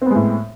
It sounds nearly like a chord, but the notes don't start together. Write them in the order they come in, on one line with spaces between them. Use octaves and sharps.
C4 B3 G#3 A2